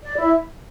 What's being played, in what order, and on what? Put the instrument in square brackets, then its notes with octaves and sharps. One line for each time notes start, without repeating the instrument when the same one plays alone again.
[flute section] D5
E4